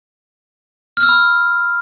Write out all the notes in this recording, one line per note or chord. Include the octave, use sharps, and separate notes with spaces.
F6
E6
B5